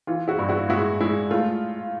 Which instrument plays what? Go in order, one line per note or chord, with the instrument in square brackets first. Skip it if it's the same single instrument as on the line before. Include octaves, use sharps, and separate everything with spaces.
[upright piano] E3 F4
E4 F#4
G2
E4 F#4
G#3 E4 F#4
G#3 E4
A3 F4